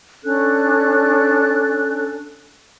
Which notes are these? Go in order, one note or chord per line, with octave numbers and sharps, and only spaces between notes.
C#4 D4 A4 F#6